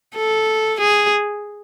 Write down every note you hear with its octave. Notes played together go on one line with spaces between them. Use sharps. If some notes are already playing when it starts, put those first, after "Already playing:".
A4
G#4